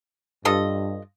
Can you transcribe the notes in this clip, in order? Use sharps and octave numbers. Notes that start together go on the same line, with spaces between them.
G2 F4 A4 D#5